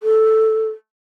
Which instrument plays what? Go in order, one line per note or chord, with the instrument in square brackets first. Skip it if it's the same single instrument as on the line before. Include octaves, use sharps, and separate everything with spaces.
[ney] A4